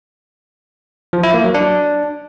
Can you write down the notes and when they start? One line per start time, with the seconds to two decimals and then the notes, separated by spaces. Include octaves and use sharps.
1.13 F3
1.23 E4
1.34 A#3
1.44 F#3
1.54 D4